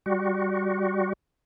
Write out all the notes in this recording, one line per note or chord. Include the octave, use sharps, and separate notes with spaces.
G3 F#4